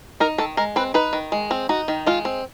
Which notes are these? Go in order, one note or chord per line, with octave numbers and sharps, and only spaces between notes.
D#4 A#4
D#3 A4
G#3 A#4
C4 B4
D#4 B4
D#3
G#3
C4
D#4 F#4
D#3
G#3 F4
C4